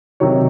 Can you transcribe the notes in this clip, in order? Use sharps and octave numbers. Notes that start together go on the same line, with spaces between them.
C3 D#3 F#3 C#5